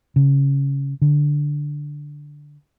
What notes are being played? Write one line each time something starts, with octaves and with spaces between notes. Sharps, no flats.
C#3
D3